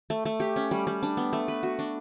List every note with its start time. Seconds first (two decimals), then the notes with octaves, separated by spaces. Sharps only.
0.10 A3
0.25 A3
0.40 G4
0.56 C#4
0.71 G3
0.87 G3
1.03 D4
1.17 B3
1.33 A3
1.48 B4
1.63 F#4
1.79 D4